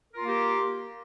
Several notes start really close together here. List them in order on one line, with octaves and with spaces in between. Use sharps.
A#4 F4 A#3 G4